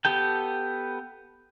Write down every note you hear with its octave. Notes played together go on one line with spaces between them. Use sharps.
B3 G4 A4 G5